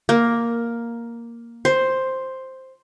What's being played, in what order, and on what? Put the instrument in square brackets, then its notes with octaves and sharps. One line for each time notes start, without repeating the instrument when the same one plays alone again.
[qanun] A#3
C5